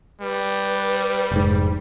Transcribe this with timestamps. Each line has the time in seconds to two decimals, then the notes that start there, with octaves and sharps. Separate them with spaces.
0.21 G3 B4
1.32 F1 G#2